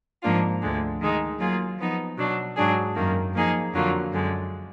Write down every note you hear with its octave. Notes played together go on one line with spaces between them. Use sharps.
G#2 F3 A#3 D4 F4
D2 D3 G#3
D#3 G#3 D#4
F#3 A#3 F4 G#4
F3 B3 D#4
B2 F#3 D4
G#2 F#3 D4 G#4
F#2 D#3 A#3
F3 A#3 D#4 G#4
F2 D3 F#3 A#3 F4
F#2 D3 G#3